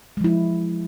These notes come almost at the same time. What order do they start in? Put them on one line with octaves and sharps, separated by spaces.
G#3 F3 E4